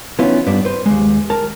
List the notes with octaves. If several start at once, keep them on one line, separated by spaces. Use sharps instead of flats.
E3 B3 C#4 D#4 F4
G2 B3 D4
B4 C5
D#2 G#3
A#4 A5